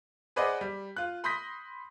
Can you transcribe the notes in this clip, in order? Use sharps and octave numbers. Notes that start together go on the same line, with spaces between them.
G#4 B4 C5 D5 D#5 F#5
G3
F4 F#6
B5 C6 D#6 G6 A#6 B6